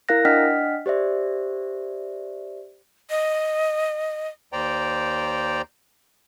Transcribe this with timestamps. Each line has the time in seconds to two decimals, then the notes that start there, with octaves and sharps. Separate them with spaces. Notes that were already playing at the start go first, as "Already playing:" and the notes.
0.09 E4 A#4 F5 F#6 A#6
0.25 D4 D#5 F#5 G5 F6 B6
0.86 G4 C5 D5 E5
3.10 D#5
4.53 D#2 C5 D5 G5 A#5